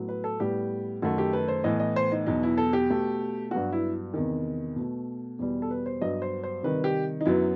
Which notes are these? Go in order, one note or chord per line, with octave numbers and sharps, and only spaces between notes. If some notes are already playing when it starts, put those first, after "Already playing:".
Already playing: A2 F#3 B3
B4
A4
A2 G3 B3 G4
F#2 D#3 A3 F#4
G4
B4
C5
A2 E3 B3 D#5
D#5
C5
D#4
E2 B2 F#3 D#4
E4
A4
G4
B2 A3
G2 F#3 B3 F#4
E4
E2 C3 D#3
B2 A3
E2 B2 G3
A4
B4
C5
G2 F#3 B3 D#5
C5
C5
C3 D#3 G3 B4
G4
D#4
F#2 F#3 B3 E4